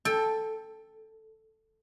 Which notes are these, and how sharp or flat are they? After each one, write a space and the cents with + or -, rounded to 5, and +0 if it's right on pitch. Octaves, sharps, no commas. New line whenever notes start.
A4 +0 G5 +25